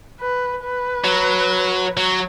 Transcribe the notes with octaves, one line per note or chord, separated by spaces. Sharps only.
B4
B4
F#3
F#3